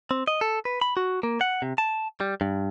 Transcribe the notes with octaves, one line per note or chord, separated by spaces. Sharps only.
C4
D#5
A4
B4
B5
F#4
A#3
F#5
C3
A5
G3
G2